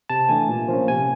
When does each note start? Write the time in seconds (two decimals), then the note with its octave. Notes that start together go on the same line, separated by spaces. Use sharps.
0.09 C3 A5
0.29 E3 A3 D4 G#5
0.49 A#2
0.68 F3 A#3 C#4
0.88 C3 G#5